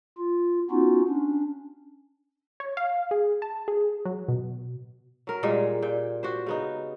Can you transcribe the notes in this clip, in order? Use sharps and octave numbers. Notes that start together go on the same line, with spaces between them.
F4
B3 C#4 D#4 F4 F#4
C#4 D4
C#5
F5
G#4
A5
G#4
F#3
B2
F#3 A#4
A#2 G3 G#3
A#2 G5
F#4 G4 C5
C#3 B3 D#4